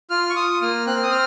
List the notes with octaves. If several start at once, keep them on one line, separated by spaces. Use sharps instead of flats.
F4 F6
C#6
F4 D#6
A#3 F6
C4 F#6
F6
D#6
F6